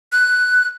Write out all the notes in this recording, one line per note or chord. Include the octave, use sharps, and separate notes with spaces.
F#6